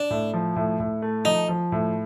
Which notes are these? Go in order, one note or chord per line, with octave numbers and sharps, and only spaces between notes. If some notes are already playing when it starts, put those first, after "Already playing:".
Already playing: D4
A2
F3
A2
A2
A3
F3 D#4
F3
A2